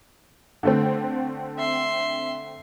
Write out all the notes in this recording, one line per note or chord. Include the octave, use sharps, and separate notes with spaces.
D3 A3 C4
E5 C6